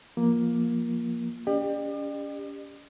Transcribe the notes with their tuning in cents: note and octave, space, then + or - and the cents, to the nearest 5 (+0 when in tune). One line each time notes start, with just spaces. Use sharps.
F3 -10 A#3 +10 F4 +0
C#4 +40 G4 +20 D5 +45